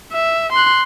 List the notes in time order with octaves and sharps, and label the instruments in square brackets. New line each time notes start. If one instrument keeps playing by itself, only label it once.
[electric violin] E5
C6 F#6